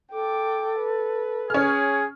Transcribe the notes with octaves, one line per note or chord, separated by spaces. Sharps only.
A4 G5 D6
B4
C#4 G#4 F6